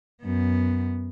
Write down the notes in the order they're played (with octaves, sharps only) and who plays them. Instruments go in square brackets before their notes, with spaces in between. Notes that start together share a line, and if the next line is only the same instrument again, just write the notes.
[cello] F#2 B3